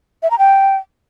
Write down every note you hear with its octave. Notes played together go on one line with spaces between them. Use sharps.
E5
A#5
G5